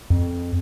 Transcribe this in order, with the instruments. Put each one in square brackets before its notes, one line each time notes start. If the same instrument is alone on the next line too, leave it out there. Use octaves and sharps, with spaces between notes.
[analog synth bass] F2